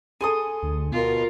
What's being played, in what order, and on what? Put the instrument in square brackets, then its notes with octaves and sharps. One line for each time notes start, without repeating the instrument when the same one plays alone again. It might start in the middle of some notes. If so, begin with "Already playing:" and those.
[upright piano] G#4 A4 [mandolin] G#5 C6 D#6
[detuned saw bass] D2
[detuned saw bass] B2 [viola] F4 A#4